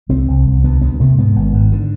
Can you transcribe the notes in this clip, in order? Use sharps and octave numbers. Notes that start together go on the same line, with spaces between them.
C2 C4
C2
C2
D2 B3
D2 B3
C3 A3
G#2 B3
G#1
G#2
D3